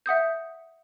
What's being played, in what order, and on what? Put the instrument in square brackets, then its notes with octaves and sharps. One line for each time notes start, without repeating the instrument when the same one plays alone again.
[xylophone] E5 F#5 D#6 G6